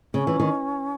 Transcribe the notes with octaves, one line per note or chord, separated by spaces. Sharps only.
C#3 C#4
E3
D#3